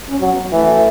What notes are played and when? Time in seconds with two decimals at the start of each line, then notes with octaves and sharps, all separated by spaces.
0.10 C#4
0.21 F#3
0.31 B3
0.53 E3 A3